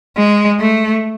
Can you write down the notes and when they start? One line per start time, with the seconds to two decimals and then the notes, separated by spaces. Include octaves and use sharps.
0.17 G#3
0.60 A3